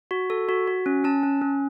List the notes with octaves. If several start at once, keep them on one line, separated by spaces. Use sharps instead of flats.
F#4
A4
F#4
F#4
C#4
C#4 A5
C#4
C#4